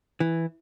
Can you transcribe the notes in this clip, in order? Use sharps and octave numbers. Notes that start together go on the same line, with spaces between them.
E3